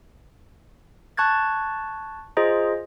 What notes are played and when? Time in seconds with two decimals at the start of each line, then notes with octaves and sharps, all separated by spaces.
1.17 A5 C#6 F#6 G#6 A6
2.37 F4 G#4 C5 D#5 A#5